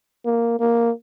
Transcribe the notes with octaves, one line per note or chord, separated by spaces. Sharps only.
A#3
A#3